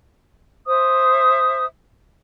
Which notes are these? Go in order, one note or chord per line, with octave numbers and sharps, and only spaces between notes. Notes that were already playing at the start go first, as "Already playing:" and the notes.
C5 E5 D#6